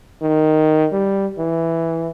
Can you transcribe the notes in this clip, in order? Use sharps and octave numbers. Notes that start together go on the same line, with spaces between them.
D#3
G3
E3